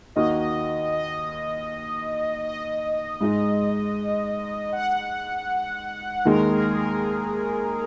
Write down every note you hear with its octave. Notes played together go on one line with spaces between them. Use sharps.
D#2 D#3 A#3 F#4 D#5
D#5
D#5
G#2 G#3 D#4
F#5
D#2 D#3 G#3 A#4
G#4
A#4